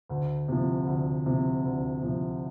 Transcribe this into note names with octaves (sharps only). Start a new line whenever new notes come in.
D2
C3 F3
D2
C3 F3
D2
C3 F3